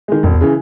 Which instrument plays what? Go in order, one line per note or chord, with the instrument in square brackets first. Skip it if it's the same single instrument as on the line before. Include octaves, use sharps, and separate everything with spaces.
[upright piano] D#3 G#3
[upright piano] E1 [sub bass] F2
[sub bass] E2
[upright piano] C#3 E3